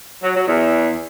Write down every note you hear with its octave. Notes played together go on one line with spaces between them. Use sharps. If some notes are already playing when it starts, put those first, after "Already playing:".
F#3
F#3
E2